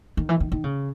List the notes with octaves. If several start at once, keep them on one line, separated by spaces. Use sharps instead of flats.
D#3
E3
D#3
D#3
C#3